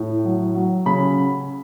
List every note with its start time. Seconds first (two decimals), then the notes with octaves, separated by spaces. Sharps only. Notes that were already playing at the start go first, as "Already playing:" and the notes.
Already playing: A2
0.24 F#3
0.55 F#3
0.86 C#3 B5